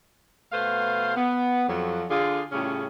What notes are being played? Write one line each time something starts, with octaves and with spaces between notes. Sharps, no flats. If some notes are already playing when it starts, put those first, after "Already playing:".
B2 A3 B4 C5 F5
B3
F2 F#3
D3 F4 G#4
A2 C#3 G3 C#4 F4 G#4